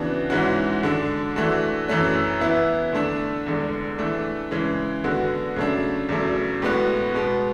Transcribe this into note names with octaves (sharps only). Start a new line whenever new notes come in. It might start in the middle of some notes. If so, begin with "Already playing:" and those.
Already playing: C#3 E3 B3 D4 F#4
G#2 E3 G#3 C#4 F#4
D3 G#3 D4
E3 A3 D4 F#4
F#2 E3 A3 C#4
E3 B3 E4
D3 A3 D4
E2 D3 G#3
E3 A3 D4
C#3 E3 G#3
D3 G#3 B3 F#4
C#3 F#3 A3 D4
E2 C#3 F#3 A3
A2 G#3 B3 F#4
B2 G#3 B3